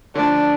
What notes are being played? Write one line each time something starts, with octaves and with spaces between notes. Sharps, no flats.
D3 F3 A3 D4